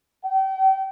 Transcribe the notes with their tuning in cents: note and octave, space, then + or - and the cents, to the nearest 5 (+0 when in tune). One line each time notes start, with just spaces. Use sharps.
G5 -35